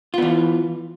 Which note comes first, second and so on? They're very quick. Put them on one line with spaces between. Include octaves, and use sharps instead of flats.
F4 B3 E3